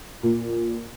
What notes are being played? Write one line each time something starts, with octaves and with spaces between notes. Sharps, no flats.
A#2